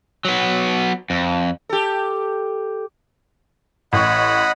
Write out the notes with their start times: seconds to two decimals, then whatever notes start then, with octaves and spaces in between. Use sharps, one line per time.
0.25 F#3 B3
1.10 F2
1.69 G4 A4
3.93 A1 D#5 F#5 B5 C#6